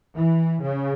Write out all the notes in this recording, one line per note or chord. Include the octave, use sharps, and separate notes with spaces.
E3
C#3